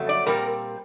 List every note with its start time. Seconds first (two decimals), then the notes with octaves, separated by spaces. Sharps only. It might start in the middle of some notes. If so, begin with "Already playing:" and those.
Already playing: F2 C#3 F#3 A3
0.09 D5
0.26 A#2 G3 C4 A#4